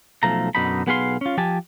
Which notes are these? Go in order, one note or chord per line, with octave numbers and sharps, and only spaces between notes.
B1 F3 A3 A#5
F#2 B2 D3 D#4 B5
B1 B3 G#4 B4 F5 C6
C#4 F4
F3 G4 G#5 A5